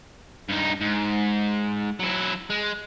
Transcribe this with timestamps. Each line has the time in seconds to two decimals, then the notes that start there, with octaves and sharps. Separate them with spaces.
0.49 G2 D#4
0.81 G#2
2.00 F#3 E4
2.50 G#3